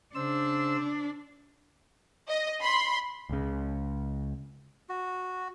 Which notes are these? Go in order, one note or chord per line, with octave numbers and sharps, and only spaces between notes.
C#3 D4 C5 E6
D#5
B5 C6
C#2 C#3
F#4